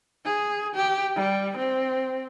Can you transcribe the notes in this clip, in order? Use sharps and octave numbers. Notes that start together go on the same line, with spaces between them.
G#4
G4
G3
C4